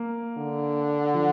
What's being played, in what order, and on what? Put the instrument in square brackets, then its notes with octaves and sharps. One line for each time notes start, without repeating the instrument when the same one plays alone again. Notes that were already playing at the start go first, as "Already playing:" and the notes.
Already playing: [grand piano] A#3
[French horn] D3
[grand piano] F3